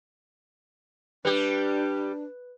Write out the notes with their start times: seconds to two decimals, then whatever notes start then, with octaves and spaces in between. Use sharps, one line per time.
1.25 G3 D4 G4 B4